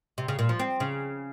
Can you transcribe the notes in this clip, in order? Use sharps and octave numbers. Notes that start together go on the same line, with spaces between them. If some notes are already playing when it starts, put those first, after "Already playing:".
C3
C#3
A#2
F3
C4
C#3